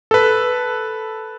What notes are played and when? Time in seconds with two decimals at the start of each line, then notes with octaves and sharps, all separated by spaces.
0.11 A4 B4